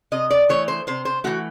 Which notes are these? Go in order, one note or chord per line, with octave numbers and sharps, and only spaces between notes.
C3 D#5
D5
E3 A3 C#5
C5
C3 C5
C5
E3 A3 F#4